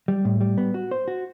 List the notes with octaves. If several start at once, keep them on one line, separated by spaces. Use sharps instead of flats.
G3
A2
G3
B3
F#4
C5
F#4